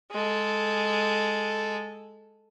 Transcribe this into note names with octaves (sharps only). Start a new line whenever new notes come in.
G#3 A4